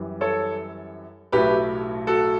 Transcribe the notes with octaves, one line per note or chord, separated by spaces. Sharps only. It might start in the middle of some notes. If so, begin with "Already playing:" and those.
Already playing: F#2 E3 G3
A4 C#5
B1 A2 F#3 A3 G4 B4
F#4 A4